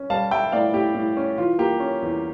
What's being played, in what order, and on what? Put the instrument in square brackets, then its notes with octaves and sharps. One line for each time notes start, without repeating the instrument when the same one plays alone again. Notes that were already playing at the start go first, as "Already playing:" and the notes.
Already playing: [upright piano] C#4
G3 F5 A5
G3 E5 G5
A2 D5 F5
A2 G4
A2
C#4
E3 F4
A#3 G4
C#4
E2